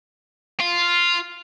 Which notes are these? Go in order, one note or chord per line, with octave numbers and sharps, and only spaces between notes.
F4